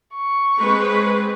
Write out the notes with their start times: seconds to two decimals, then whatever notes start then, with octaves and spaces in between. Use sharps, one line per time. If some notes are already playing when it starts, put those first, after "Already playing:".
0.15 C#6
0.59 G#3 C4 B4